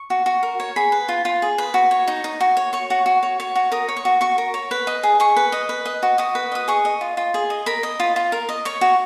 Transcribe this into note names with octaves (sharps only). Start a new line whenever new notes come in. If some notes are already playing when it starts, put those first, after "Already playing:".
Already playing: C#6
F#4
F#4
A#4
C#5
G#4 B5
B4
F4
F4
G#4
B4
F#4
C#5
D#4
D#4
F#4
C#5
C#5 C#6
F#4
F#4
C#5
C#5
F#4
A#4 D#6
C#5
C#6
F#4
F#4 C#6
A#4
C#5
B4
D#5
G#4
G#4 C#6
B4
D#5
B4
D#5
F#4
F#4 D#6
B4
D#5 D#6
G#4 C#6
D#5
F4
F4
G#4
D#5
A#4 B5
D#5
F4
F4
A#4
D#5
C#5 C#6
F#4